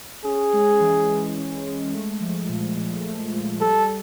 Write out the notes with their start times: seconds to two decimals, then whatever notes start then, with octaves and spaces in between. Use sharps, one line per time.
0.24 C#4 G#4
0.53 G#3
0.81 E3
1.09 E3
1.37 C#4
1.64 G#3
1.93 A3
2.20 F3
2.49 A#2
2.77 A#2
3.04 A3
3.33 F3
3.60 G3 A4